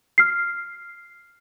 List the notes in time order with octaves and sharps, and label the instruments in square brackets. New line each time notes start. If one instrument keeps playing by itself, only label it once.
[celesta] F6 C7